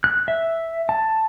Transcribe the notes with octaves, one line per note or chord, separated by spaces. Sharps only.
F#6
E5
A5